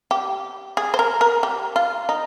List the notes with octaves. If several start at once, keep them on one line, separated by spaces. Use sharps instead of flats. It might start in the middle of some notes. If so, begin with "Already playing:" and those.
G4
G#4
C5
A#4
A#4
G4
F4
D#4